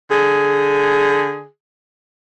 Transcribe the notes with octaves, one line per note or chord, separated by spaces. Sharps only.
D3 G#4